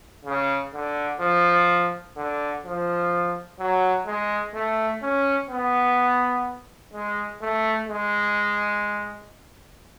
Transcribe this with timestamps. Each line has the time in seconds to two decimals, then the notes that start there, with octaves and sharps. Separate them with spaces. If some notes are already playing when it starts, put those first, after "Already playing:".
0.25 C#3
0.74 D3
1.20 F3
2.16 D3
2.64 F3
3.59 F#3
4.06 G#3
4.54 A3
5.02 C#4
5.49 B3
6.93 G#3
7.41 A3
7.88 G#3